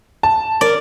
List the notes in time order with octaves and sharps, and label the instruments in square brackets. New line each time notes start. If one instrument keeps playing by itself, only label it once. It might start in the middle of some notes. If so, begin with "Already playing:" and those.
[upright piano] A5
[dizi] A#4 [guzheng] D5